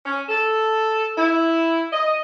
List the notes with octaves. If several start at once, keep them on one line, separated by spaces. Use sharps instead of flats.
C#4
A4
E4
D#5